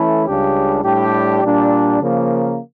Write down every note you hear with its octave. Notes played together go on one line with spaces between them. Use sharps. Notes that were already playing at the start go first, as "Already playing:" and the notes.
Already playing: E3 A3 C#4 E4 A4
C#2 C#3 G3 D4 G4
A2 G3 D4 G4
A#2 G3 D4
C#3 F3 A#3